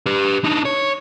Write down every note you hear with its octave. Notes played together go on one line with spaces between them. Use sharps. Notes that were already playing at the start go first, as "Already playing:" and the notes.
G4 B4
D4 D#4
C#5